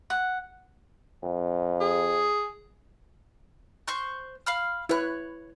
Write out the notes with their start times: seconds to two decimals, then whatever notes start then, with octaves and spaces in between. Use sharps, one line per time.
0.10 F#5
1.23 F2
1.81 G#4
3.88 C5 C#6 F#6
4.46 F5 B5 F6
4.89 E4 B4 C#5 F#6